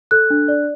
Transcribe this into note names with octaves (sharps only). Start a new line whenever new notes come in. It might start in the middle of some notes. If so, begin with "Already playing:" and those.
A4 F#6
D4
D5